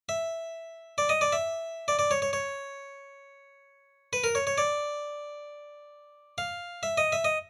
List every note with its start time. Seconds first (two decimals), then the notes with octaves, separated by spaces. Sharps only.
0.09 E5
0.98 D5
1.09 D#5
1.21 D5
1.33 E5
1.88 D5
1.99 D5
2.11 C#5
2.22 C#5
2.33 C#5
4.13 B4
4.24 A#4
4.35 C#5
4.47 C#5
4.58 D5
6.38 F5
6.83 E5
6.97 D#5
7.12 E5
7.24 D#5